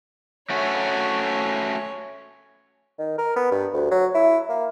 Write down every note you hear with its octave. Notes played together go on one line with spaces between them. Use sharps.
A3 C#4 F#4 C#5
D#3
A#4
B3
G2
D2
F#3
E4
A#3